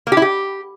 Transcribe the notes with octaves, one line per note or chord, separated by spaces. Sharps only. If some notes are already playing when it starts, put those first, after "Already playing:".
A#3
G4
E4
G4